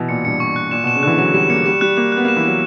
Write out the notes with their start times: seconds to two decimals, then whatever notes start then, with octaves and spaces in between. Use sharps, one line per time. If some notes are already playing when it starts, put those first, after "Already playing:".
Already playing: B2 E3
0.09 A#2 C#7
0.25 G2 C#7
0.40 C#6
0.56 F#6
0.71 A#2 E7
0.84 B2
0.87 E7
0.95 C#3
1.03 D3 F#6
1.07 E3
1.18 F#3 E7
1.34 G3 E7
1.50 A#3 C#7
1.66 G3 E7
1.81 G3 F#6
1.97 A#3 F#6
2.12 B3 F#6
2.25 A#3
2.28 E7
2.37 E3
2.44 F#3 E7